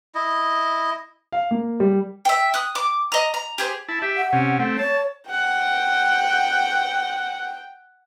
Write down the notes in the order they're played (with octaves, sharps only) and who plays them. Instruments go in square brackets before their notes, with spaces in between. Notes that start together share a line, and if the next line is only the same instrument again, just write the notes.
[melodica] E4 D#5
[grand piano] F5
A#3
G3
[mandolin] E5 G5
D#6 F#6
D6
D#5 A#5
A#5
G4 G#4 C5
[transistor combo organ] E4 A5
G4 E5
[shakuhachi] F#5
[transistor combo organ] C3 C#4
A3 C4
[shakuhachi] C#5 [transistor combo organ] A5
[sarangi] F#5 [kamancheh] G5